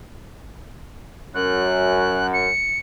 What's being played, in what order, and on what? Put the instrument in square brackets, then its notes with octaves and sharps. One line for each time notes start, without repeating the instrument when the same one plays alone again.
[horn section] F#2 [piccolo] F#6
[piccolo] C#7